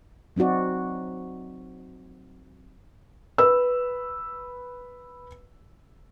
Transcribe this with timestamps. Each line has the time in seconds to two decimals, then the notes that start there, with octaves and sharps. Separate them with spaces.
0.36 F#3 C4 D#4 F#4 D5
3.38 B4 E6